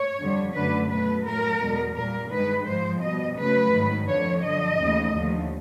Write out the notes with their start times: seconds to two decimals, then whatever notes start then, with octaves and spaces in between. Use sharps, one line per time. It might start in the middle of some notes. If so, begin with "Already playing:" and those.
Already playing: C#5
0.19 F2 D3 G3
0.54 F#2 D3 F#3 A3 B4
0.89 B2 F#3 A3 B4
1.25 A2 F#3 A3 A#4
1.60 E2 B2 G#3
1.96 A#2 G3 A#4
2.31 G2 D#3 G#3 B4
2.66 G#2 F3 G#3 C5
3.02 B2 G3 D#5
3.37 F#2 C#3 F#3 A3 B4
3.72 G#2 D#3 F#3 A3
4.07 F2 D3 F3 C#5
4.42 F#2 D3 F3 D#5
4.78 D#2 C#3 E3 A3
5.13 D#2 D3 F3 A3